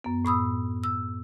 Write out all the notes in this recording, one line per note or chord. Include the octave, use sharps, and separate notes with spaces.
F#2 B3
A2 B5 D#6 E6
E6